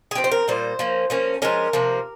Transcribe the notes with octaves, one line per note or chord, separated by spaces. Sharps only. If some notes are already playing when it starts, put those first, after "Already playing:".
G#4
F3 C4 G4
C5
A#4
A#2 G3 A#3 C5
F3 A#3 C#4
F3 A#3 C#4
F3 G#3 C#4 A#4
C3 F3 A#3